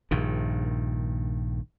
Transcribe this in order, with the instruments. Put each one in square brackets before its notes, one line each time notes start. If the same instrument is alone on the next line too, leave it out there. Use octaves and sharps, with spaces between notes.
[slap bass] A#1 G2 D#3